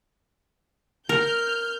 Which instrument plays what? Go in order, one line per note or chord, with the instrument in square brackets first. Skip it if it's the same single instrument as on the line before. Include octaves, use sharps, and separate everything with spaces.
[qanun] A#4 [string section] F6 G6